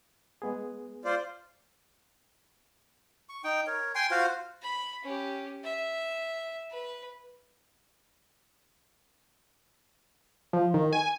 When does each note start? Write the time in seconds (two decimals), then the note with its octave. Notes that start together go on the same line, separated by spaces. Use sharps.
0.42 G#3 B3 G#4
1.05 F4 C5 D5
3.29 C#6
3.44 D#4 G5
3.67 A#4 C#5
3.95 G5 G#5 C6
4.11 F4 F#4 C5 F5
4.62 B5
5.03 C#4 G4
5.64 E5
6.70 B4
10.53 F3
10.74 D#3
10.93 G#5